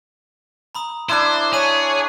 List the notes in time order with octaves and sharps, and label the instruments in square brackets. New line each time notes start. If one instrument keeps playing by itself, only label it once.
[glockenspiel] A#5 B5 D#6
[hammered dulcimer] D4 E4 [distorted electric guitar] C5 [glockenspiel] C6 D6 F#6
[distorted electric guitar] G#4 [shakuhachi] C#5 [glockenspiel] G#5 A5 D#7